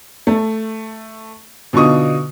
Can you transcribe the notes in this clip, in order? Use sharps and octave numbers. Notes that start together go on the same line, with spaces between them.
A3
B2 D3 D#4 F4 C#6 D#6